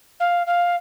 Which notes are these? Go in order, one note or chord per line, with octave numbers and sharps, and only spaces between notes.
F5
F5